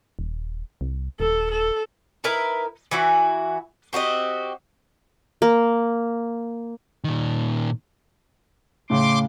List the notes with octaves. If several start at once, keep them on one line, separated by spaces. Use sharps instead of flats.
D#1
C2
D#1 A4
A4
D#4 E4 A#4 B4
E3 E4 F#4
C4 F#4 G4 D#5
A#3
A#2 D#3
A2 C#3 C6 D6